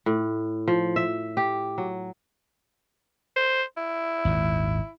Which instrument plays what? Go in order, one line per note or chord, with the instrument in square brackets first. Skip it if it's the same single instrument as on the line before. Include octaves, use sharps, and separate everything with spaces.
[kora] A2
F3
E5
G4
F#3
[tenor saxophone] C5
E4
[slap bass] G#1 D#2 A#2